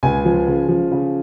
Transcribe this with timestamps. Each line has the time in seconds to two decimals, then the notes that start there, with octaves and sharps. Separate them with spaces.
0.03 C#2 G#5
0.25 F3
0.47 C#3
0.69 F3
0.92 C#3